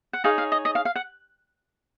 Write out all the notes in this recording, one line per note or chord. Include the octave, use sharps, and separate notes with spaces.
F#5
D#4 G#4 C#5 F5
F5
D#5
D#5
F5
F5
F#5